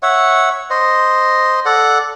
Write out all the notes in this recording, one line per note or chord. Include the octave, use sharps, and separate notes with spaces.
C#5 E5 F#5
C5 D#5
A4 D5 F#5